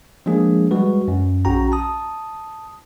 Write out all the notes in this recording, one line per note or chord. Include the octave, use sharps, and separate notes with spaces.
F3 G#3 A#3 D4 G#4
G3 G#3 F#4 B4
F#2
A#1 C#4 F#4 G5 A#5
A5 D#6